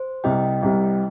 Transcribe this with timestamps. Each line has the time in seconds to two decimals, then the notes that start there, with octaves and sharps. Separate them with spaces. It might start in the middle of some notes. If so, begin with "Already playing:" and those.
Already playing: C5
0.24 C2 C3 G3 D#5 G5
0.62 C2 C3 G3